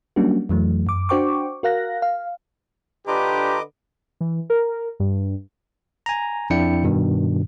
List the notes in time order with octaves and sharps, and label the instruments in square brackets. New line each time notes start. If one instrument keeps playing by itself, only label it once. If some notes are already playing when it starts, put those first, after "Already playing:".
[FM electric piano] F#3 G3 A#3 C#4 D4 F#4
F2 E3 F#3 A3
F#2 D6
D4 F#4 C5 G5 C#6 D6
F#4 A#4 F5 F#6 A#6
F5
[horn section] D3 B4 [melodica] D4 F4 A#5 [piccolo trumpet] G4 [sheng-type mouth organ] D#5 D6
[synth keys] E3
A#4
G2
[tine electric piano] G#5 A#5
F2 D4 E4 D5 G5 C#7
G2 B2 D#3